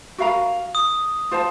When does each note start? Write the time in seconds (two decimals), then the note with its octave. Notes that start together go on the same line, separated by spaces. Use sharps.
0.18 F#4 A#4 F5 A#5
0.75 D#6
1.31 F4 C5 F5 A5